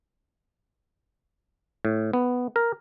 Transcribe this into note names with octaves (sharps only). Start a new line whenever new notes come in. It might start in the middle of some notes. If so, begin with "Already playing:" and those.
A2
B3
A#4